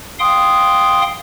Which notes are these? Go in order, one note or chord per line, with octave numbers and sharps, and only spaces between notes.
F5 G5 C6 D#6